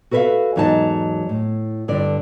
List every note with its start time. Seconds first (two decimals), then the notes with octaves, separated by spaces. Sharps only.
0.11 F#4 A4 B4 C#5 E5 F5
0.56 E2 G#2 F#3 D#4 C#5 A5
1.29 A2
1.88 G2 D3 D5